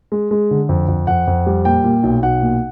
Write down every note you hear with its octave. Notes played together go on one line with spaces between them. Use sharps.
G#3
G#3
D3
F2
F2
F2 F#5
F2
G3
A#2 G5
A#2
B1
B1 F#5
A#2